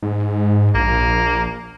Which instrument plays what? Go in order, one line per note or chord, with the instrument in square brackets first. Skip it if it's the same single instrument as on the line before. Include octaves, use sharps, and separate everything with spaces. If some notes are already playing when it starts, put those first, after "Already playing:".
[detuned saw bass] G#2
[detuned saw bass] A#1 [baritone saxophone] A#3